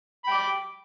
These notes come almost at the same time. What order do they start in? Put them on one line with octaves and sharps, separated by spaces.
B5 G5 D6